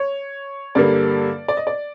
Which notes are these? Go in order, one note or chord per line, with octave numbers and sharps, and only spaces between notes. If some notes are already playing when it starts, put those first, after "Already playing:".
Already playing: C#5
G2 D3 G3 A#3 D5
D5
D#5
D5